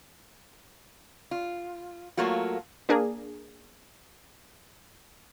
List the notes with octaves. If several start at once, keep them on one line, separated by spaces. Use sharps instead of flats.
F4
F#3 A3 A#3 F4 F#4
A#3 D4 G#4 A#4